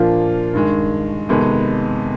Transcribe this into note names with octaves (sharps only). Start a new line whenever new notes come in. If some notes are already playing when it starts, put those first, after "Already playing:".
Already playing: A#2 F3 A#3 D4 F4
G2 D#3 G#3
F2 C3 D#3 G#3 B3